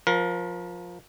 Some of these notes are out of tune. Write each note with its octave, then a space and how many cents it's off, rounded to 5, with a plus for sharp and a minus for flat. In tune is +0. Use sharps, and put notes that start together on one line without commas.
F3 +15 A#4 +30